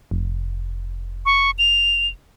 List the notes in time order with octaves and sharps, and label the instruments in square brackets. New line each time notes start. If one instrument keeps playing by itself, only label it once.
[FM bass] F1
[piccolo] C#6
F7